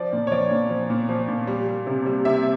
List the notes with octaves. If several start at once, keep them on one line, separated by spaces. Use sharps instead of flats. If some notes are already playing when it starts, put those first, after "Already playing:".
Already playing: F3 D5
A#2
C#5
F3 D5
A#2
F3
A#2
F3
A#2
G3
G3
C3
G3
C3 E5